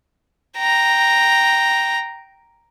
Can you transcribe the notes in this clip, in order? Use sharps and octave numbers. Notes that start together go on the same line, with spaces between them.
G5 A#5